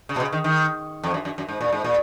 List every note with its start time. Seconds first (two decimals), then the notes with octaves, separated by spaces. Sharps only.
0.09 C#3
0.16 B2
0.20 C#3
0.32 D#3
0.44 D#3
1.04 F2
1.14 F#2
1.25 F#2
1.38 F#2
1.49 G#2
1.61 A#2
1.72 G#2
1.84 A#2